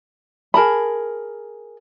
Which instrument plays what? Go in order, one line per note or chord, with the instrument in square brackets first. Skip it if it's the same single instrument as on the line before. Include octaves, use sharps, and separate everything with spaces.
[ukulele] G#4 A#4 A5 B5